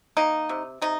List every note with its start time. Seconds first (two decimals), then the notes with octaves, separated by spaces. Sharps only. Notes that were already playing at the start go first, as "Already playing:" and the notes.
0.17 A#3 D#4
0.49 C3
0.82 C3 D#4